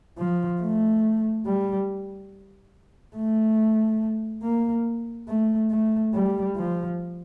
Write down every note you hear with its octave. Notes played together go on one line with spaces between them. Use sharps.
F3
A3
G3
A3
A#3
A3
A3
G3
F3